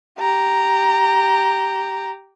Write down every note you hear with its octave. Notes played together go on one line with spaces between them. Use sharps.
G4 A#5